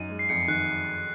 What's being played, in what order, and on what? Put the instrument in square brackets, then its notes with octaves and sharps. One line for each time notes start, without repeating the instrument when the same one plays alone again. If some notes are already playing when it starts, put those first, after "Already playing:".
Already playing: [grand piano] F#2 D#4 [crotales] D#7
[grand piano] G#3
[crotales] C7
[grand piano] F2 [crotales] C#7
[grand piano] D#3 [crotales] F#6